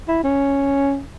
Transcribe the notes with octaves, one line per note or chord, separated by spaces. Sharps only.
E4
C#4